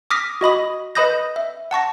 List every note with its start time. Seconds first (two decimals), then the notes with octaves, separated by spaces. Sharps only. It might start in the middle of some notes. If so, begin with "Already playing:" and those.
0.10 D6 D#6 F6 A#6 B6
0.41 F#4 D#5 B5 D#6
0.95 B4 D#5 B5 D#6 G6 A#6
1.36 E5
1.71 F#5 A5 C#6 A#6